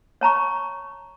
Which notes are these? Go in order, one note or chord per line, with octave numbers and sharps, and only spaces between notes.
C#5 A5 A#5 C#6